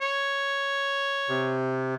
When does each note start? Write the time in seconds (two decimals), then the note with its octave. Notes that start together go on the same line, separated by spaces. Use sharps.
0.01 C#5
1.29 C3